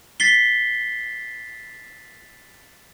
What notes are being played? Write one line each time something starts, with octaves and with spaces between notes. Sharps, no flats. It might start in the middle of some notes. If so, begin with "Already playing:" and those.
A6 B6 C7 G7